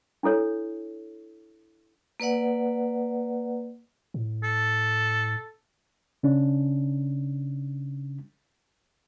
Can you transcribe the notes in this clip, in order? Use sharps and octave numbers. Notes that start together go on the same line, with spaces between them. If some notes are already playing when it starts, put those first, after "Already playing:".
D4 E4 A4 C#5
A#3 B4 D5 F#5
A2
A4
C#3 C#4 D4